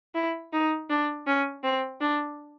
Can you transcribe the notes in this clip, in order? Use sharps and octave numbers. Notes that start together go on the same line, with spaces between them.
E4
D#4
D4
C#4
C4
D4